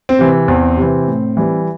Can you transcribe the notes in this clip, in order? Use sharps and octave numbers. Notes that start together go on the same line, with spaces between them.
C4
C3 E3
E2 C4
C3 E3
A2
E3 G3